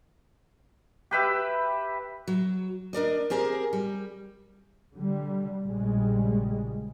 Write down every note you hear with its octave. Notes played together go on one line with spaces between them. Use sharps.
G4 B4 E5
F#3
D4 A#4 D5 D#5
C4 G4 G#4 A#4
G3
D3 G3
A#1 C#3 G3 G#3